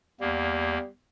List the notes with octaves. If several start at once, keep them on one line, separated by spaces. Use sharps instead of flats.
E2 G3 A#3